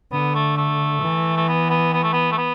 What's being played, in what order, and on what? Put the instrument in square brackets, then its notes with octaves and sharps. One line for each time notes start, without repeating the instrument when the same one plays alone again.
[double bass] D3 [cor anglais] B3
[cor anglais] A3
A3
[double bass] E3
[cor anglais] A3
B3
B3
B3
A3
B3
A3
B3